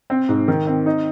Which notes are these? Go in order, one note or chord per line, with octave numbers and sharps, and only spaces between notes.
C4
G#2
D#3
C4
D#4